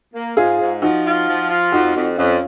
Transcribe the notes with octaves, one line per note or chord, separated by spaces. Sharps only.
A#3
G#2 F4 G#4
G#2
F3 D#4 F#4
F4
F3
F4
F2 D#4 F#4
F2
F2 C#4 F4